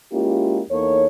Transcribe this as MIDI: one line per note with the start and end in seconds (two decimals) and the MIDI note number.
0.12 0.61 56
0.12 0.61 58
0.12 0.61 61
0.12 0.61 64
0.12 0.61 65
0.12 0.61 67
0.70 1.06 40
0.70 1.06 58
0.70 1.06 63
0.70 1.06 69
0.70 1.06 73